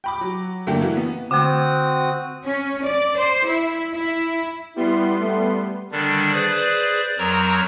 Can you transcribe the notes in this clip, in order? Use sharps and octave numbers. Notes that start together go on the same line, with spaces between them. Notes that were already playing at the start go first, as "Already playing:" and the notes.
G5 B5 D6
F#3
F#2 D3 A3 A#3 D4 G5
E3 E4 F#4
B3
D3 A3 C4 F#4 D#6
C#4
D5
C5
E4
E4
G3 B3 E4 C6
A3
D3 D#3 G3 D4
G#4 B4 C5 D5
F2 F#3 A#4 C#5 A#5